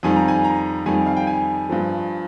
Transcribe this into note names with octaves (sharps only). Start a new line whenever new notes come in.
F2 D#3 G3 G#5
A#5
G#5
A#5
F2 D#3 G3 G#5
F5
G5
G#5
G2 F3